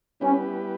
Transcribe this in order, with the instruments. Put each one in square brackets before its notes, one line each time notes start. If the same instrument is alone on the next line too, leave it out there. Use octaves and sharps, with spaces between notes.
[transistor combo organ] G3 B3 E4 G4 B4 [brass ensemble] C#4